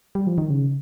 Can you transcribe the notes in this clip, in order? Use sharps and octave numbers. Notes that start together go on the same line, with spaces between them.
G3
F3
D#3
C#3